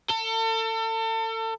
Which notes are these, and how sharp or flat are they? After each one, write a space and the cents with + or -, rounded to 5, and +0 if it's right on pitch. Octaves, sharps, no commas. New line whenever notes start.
A4 +35